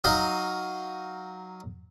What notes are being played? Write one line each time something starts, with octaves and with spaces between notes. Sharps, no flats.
F#3 D#4 D#5 F5